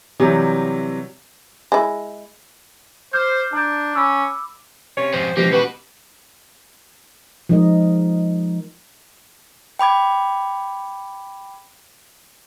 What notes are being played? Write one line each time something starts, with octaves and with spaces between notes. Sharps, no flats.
C3 E3 F#3 G3
G#3 E4
C5 D6 F6 G6
D4 A5 A#5 G6
C#4 B5 D6 E6
C3 C#4 F4 C#5
F2 G#2 C5
C#2 B2 E3 F3 A#3 G4
B3 F#4 B4
F3 G#3 D#4 A#4 D#5
G5 B5 D6 G#6